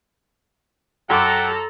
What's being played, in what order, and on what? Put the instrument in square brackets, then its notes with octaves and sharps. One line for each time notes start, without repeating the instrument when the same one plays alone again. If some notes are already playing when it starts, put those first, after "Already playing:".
[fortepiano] F#2 D6 [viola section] A4 A#5 [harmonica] F#5 G5